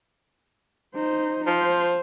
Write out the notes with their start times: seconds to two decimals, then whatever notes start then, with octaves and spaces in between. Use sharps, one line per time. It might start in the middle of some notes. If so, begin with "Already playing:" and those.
0.95 D#4 C5
1.47 F3 C5